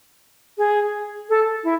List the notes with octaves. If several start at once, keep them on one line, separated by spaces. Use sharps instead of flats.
G#4
A4
E4